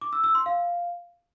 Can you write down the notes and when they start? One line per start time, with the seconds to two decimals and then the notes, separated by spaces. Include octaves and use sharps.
0.01 D6
0.13 E6
0.24 E6
0.35 C6
0.46 F5